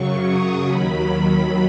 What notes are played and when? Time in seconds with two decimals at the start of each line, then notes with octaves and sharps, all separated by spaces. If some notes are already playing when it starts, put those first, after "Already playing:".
Already playing: F#2 C#3 F#3 C#6
0.26 D#6
0.66 D#2 D#3 F#3 B5